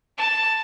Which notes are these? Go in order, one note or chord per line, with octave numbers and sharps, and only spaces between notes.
A5